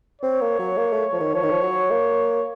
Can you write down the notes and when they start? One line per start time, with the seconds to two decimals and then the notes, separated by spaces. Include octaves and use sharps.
0.22 C4 C#5
0.41 A#3
0.59 F#3
0.78 A#3
0.93 A3
1.13 F3
1.20 D#3
1.34 F3 C#5
1.43 D#3
1.51 F3
1.63 F#3
1.91 A#3